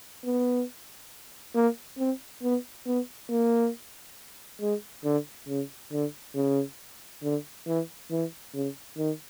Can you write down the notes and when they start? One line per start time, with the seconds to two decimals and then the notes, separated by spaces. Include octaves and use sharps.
0.24 B3
1.55 A#3
1.98 C4
2.42 B3
2.86 B3
3.29 A#3
4.61 G#3
5.04 D3
5.48 C#3
5.91 D3
6.35 C#3
7.23 D3
7.67 E3
8.11 E3
8.54 C#3
8.97 D#3